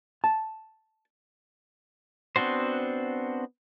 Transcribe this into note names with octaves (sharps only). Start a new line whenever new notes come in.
A5
B3 C4 D4 F#4 C5